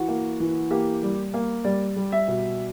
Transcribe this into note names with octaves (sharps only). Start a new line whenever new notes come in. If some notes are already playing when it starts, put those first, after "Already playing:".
Already playing: E3 F#4
A#3
E3
A#3 G4
G3
A#3
G3 D5
G3
E5
B2